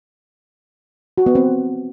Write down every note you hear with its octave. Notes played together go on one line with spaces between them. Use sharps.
F#4
B3
C4